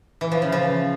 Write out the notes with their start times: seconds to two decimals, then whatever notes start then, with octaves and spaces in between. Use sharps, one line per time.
0.21 E3
0.31 F3
0.42 C#3
0.52 F3